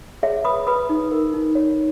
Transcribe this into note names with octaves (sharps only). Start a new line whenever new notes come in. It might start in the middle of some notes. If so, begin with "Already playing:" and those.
G#4 C#5 E5
B4 B5 D#6
B4 B5 D#6
D#4
A#4
D#4
C#5